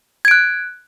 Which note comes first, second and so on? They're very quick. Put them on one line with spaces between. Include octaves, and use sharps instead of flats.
G#6 D7 F#6